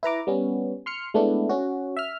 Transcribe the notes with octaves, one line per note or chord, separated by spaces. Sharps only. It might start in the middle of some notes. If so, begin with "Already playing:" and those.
E4 B4 A#5 D6
G3 B3 C#4
C6 F6 C#7
G#3 A3 B3 D4 E4
C#4 F#4
E5 F6